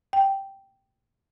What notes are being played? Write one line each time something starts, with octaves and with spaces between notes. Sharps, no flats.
G5